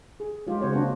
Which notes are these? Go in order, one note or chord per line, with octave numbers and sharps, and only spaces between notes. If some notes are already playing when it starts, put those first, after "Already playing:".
G#4
F#3 G#3 F4 G4
C#3 G#3 C4 F#4 C5 C#5
C#3 F#3 A#3 D4 F#4 C5